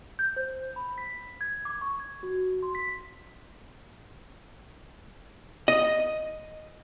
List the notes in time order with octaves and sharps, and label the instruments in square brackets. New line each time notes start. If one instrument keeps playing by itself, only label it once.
[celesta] G6
C5
B5
B6
G#6
D6
C#6
G#6
F#4
C6
B6
[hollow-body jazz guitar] D#5